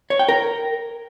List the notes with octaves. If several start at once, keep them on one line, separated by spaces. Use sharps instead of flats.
C#5
G5
A#4